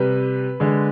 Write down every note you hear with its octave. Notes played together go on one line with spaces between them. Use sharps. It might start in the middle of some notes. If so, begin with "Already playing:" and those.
Already playing: C3 G3 B4
D3 G#3